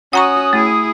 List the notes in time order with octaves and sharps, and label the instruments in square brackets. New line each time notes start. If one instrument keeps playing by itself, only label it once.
[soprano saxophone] C#4 [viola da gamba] F#4 [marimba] F#5 A#5 C#6 [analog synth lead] D#6
[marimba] A3 [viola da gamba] E4 G#4